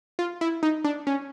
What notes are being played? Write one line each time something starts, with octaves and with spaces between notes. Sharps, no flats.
F4
E4
D#4
D4
C#4